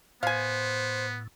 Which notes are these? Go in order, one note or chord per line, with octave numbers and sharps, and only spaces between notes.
A2 B3 C5 F5 G#5